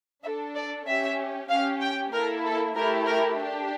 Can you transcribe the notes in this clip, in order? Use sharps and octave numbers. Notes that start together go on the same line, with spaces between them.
D4 A4 E5
D5
C#4 G4 E5
C#4 G4 F5
G5
A#3 E4 A4 A#4
A4
A3 E4 G4 A#4
A#4
D4 G4